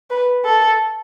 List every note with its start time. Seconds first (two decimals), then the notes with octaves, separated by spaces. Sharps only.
0.10 B4
0.44 A4